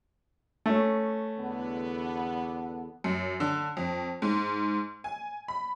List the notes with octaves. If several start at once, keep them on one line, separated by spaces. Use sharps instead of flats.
A3 C#4
E2 D3 B3
F#2
D3
F2
G#2
G#5
B5